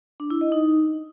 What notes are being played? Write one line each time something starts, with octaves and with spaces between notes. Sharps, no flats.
D4
E4
D#5
D#4